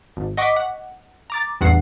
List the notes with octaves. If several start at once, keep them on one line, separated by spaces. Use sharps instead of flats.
G#1
D#5 F#5 C#6 D6 B6
F#5
A#5 D6 A6
A1 E2 G2 F#5 C7